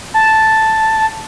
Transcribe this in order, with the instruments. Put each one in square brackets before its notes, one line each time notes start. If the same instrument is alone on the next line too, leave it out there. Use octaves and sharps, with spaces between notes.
[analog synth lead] A5